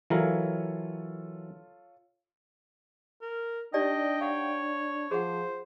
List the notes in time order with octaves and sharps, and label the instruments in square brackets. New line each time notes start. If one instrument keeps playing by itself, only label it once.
[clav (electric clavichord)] E3 F#3 A#4 [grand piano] F4 A4 C#5
[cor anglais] A#4
[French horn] D4 [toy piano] D#4 G4 D5 [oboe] D#5 [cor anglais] G5
[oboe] C#5 [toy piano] F5 F#5
[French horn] F3 [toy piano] G#4 F#5 [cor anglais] C5